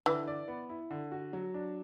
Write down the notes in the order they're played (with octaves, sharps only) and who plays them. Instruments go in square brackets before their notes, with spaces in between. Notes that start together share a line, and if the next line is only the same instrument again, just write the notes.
[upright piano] D3 [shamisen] E3
[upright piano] D5
B3
E4
D3
F#4
F#3
D4